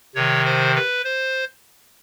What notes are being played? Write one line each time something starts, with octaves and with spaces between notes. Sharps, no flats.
C3 D#3 C#5
C5
B4
C5